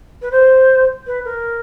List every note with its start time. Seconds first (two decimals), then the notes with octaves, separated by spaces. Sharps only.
0.22 B4
0.31 C5
1.06 B4
1.25 A#4